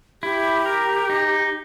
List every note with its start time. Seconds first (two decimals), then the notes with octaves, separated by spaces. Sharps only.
0.23 E4 G4
0.66 A#4
1.10 D#4